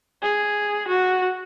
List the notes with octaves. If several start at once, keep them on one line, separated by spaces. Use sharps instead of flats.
G#4
F#4